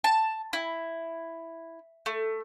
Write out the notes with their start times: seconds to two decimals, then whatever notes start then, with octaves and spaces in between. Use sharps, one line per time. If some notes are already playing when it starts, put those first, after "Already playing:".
0.04 A5
0.53 E4
2.06 A3